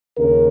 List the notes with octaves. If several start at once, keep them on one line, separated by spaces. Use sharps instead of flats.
D#2 C#3 A#4